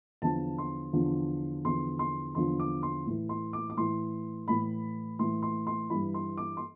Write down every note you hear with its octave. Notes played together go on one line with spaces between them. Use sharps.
E2 D3 F3 A5
C6
E2 D3 F3
E2 D3 F3 C6
C6
E2 D3 F3 C6
D6
C6
A2 E3
C6
D6
D6
A2 E3 C6
A2 E3 B5
A2 E3 C6
C6
C6
G2 E3 B5
C6
D6
C6